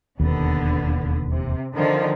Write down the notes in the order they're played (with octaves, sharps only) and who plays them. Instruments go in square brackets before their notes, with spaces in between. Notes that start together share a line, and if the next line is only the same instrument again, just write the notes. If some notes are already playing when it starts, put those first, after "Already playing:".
[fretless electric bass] E1 D#2 [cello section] D3 B3
[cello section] C3
D3 D#3 F3